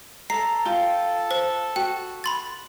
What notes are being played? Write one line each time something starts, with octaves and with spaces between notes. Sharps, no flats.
A4 A#5 C7
F4 G5
C5
F#4 G5
B5 C6 A6